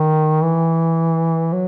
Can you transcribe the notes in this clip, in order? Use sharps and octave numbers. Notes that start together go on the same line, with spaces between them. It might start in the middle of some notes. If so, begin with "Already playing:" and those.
Already playing: D#3
E3
F#3